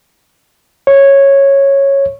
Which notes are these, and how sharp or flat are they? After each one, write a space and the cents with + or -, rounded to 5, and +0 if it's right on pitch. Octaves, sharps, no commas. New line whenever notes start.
C#5 -10